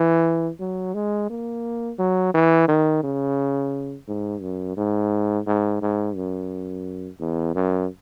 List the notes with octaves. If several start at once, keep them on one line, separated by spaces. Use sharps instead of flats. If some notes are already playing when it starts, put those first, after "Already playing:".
Already playing: E3
F#3
G#3
A#3
F#3
E3
D#3
C#3
G#2
F#2
G#2
G#2
G#2
F#2
E2
F#2